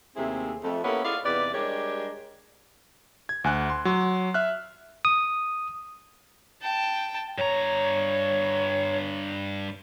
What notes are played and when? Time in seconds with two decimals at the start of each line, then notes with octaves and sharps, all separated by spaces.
0.16 D#2 C3 A3 C4 E4 G#4
0.63 F2 A3
0.84 A#3 B3 C#4 E4 G4 A4
1.04 E4 F4 G#4 D5 D#5 F5
1.25 E2 C3 D#4 G4 B4 D5
1.54 G3 G#3 D4 G4 A#4 C#5
3.29 G#6
3.44 D2 G#5 F#6
3.70 C6
3.85 F#3 C6
4.34 E5 F6 F#6
5.05 D#6
6.62 G5 A5
7.38 G2 C#5 A#5